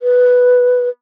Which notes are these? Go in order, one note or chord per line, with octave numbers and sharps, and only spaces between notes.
B4